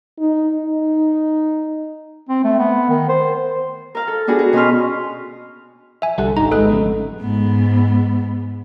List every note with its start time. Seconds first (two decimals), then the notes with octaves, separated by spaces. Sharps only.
0.19 D#4
0.65 D#4
2.29 C4
2.44 A3
2.59 B3
2.89 D#3
3.09 C5
3.95 A#4 F5
4.07 A4
4.27 B3 D4 F#4 G#4
4.39 F#4
4.53 B2 C#4 G#4 B4 C6 F6
6.02 E5 G#5
6.18 C2 D3 G3 A4 F#5 A5
6.37 G#1 D4 D#4 G4 A#5
6.52 G#3 B3 A4 D#5 F#6
6.70 F2 C#3 A3
7.21 G#2 B3